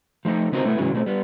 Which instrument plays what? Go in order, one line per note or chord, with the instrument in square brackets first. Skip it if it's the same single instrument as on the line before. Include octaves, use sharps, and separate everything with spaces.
[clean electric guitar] F3 A3 D#4
C#3 B3 C4 D#4 F#4 A#4
B2 A3 B3 E4
G#2 C#3 E3 F#3
B2 G3 A3 C4
G3 B3